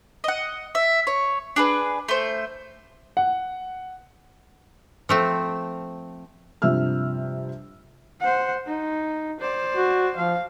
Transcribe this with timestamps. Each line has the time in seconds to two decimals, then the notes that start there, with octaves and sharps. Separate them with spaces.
0.24 D#5 F#5
0.75 E5
1.07 C#5
1.56 D4 G#4 B4
2.09 A3 C5
3.17 F#5
5.09 F3 A3 C4
6.62 G2 C3 F3 E5 E6 F6
8.20 C5 F#5
8.66 D#4
9.40 C5 D5
9.77 F#4
10.16 F3 F5